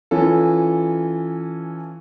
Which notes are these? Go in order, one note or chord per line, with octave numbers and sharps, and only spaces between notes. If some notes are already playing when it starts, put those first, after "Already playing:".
E3 C#4 F4 A4